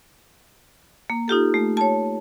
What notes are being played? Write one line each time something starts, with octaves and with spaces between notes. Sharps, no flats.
A#3
D#4 F4 G4 A4
A3
C#5 A5